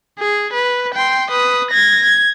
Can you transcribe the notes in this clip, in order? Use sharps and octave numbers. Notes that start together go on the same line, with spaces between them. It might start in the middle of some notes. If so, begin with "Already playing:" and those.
G#4
B4
G5 C6
B4 D#6
G#6 A#6
G#6